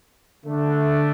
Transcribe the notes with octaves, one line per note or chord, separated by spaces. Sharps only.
D3 A3 D4